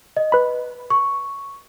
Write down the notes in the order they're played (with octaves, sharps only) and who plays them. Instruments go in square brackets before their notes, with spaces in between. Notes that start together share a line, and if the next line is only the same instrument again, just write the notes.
[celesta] D#5
[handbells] B4 B5
[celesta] C#6